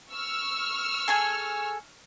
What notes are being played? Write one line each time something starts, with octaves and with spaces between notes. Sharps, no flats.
C#6 E6 F6
G#4 A4 G#5